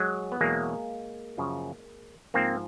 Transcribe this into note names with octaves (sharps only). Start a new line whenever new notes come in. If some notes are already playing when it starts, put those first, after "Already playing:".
Already playing: F#3 G#3
B3
E2 B2 F#3 G#3 A#3
F#2 C#3 F3
G#2 F3 A#3 C4